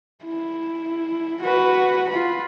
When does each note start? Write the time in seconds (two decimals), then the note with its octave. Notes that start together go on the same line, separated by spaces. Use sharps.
0.25 E4
1.42 F#4 B4
2.09 F4 B5